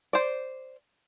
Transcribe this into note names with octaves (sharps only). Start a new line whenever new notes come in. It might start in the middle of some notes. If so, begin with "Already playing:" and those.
C5 D5